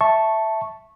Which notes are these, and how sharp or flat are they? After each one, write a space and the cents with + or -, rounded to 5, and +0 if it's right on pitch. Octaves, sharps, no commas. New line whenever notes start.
E5 +0 A5 +0 C#6 -10